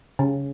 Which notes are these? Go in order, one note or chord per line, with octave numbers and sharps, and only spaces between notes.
C#3